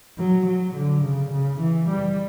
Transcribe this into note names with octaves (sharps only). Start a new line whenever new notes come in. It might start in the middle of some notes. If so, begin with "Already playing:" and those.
F#3
F#3
D3
C#3
C#3
E3
G3